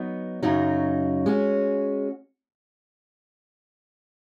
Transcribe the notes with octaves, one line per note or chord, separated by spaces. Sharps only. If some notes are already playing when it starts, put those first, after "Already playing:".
Already playing: F#3 B3 D#4
F#2 C#3 F#3 D#4 F#4
G#3 C#4 F#4